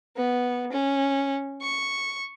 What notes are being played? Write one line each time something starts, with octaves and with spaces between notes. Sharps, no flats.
B3
C#4
C#6